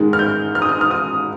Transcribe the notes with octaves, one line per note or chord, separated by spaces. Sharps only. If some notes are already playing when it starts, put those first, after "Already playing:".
Already playing: G#2 D#3 G#3
F6
G6
F6
D#6
F6
F6
D#6